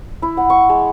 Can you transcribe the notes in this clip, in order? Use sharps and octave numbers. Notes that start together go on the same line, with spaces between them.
E4
F#5
C#6
G#3